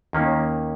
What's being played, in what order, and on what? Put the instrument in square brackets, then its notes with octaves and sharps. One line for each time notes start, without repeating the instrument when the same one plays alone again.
[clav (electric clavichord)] D#2 D#3 A#3 C#4